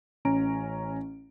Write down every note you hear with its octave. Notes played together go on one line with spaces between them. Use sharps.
A1 C#4 A#5 D7